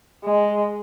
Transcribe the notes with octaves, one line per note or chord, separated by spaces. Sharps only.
G#3